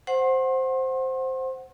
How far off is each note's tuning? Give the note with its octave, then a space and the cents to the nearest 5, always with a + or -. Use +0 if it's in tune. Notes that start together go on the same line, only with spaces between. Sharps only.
C5 +0 F#5 +0 C6 +40